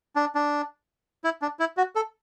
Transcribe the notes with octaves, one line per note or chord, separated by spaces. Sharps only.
D4
D4
E4
D4
E4
F#4
A4